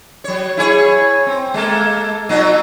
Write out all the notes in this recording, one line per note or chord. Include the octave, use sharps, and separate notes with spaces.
F#3 C#5
E4 G#4 C#5
C4
G#3 A#3 A4
A#2 F#3 D#4